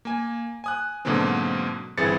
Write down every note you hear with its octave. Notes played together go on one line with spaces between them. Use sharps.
A#3 G#5
G#5 D#6 F#6
G#2 B2 D3 F#3 A#3 C4
G1 E3 C4 G#4 A6 C#7